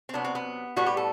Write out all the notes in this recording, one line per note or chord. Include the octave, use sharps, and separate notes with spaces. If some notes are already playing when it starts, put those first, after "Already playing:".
C4
C3 F#3 B3 D4
C4
B3
A2 G3 B3 F#4
G4
A4